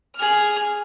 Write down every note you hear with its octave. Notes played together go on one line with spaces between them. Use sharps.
G#4 F6